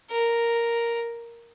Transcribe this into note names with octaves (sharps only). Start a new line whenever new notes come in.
A#4